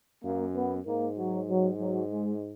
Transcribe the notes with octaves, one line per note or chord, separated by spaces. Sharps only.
F#2 A#3
B3
G#2 A#3
F#3
F#3
F#3
G#3